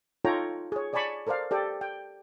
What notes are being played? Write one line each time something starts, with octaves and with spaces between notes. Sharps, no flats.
D#4 F4 A4 C#5 G5 A#5
G#4 C#5
C#5 D5 G#5 A5 B5 C#6
A4 A#4 C5 D5 F5
G4 A4 D5 G5
G5